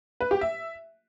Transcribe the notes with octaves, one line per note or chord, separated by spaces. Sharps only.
B4
G4
E5